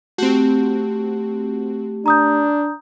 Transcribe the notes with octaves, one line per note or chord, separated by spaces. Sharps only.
A3 C4 F#4 G4
D4 A#5 D#6 G6